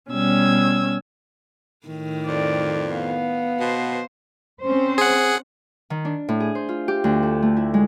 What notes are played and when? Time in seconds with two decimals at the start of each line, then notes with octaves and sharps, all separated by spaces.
0.11 B2 G3 C#4 E6 G#6
1.87 A2 D#3
2.26 F2 D5
2.90 B3 F5
3.60 B2 C5
4.62 C4 C#4 C5
4.98 G#4 F#5
5.90 D#3
6.05 D4
6.29 A2
6.40 G#4
6.55 C5
6.69 F4
6.88 G4
7.04 D2
7.23 A4
7.42 A3
7.57 E4
7.74 G#3